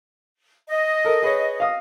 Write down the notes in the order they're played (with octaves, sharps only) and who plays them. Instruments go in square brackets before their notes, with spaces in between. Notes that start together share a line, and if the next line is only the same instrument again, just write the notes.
[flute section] D#5
[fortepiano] A4 A#4
G#4 B4 C#5
F5 D#6